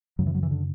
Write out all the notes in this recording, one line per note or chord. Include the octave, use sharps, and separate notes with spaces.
F#2 C#3 F#3
E3
F#3
E3
D3